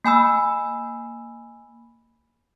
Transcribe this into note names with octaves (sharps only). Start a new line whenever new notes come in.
A#3 G#5 B5 E6